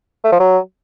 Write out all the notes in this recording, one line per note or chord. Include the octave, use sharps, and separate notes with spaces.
A3
F3
F#3